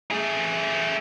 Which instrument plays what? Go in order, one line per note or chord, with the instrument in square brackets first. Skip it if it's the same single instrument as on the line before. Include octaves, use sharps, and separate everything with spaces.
[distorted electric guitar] A3 G#4